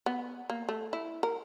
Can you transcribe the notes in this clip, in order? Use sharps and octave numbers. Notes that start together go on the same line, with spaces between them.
B3
A#3
A3
E4
A#4